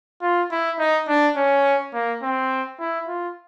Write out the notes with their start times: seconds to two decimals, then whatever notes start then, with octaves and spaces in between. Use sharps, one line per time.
0.22 F4
0.51 E4
0.79 D#4
1.08 D4
1.36 C#4
1.94 A#3
2.23 C4
2.79 E4
3.08 F4